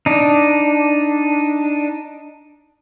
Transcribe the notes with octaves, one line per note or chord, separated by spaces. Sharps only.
D4 D#4